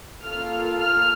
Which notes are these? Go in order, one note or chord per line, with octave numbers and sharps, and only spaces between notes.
A#3 F4 A4 F6
F6